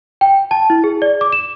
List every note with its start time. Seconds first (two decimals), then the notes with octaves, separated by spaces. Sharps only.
0.21 G5
0.51 A5
0.70 E4
0.84 G#4
1.02 D5
1.21 D6
1.33 E7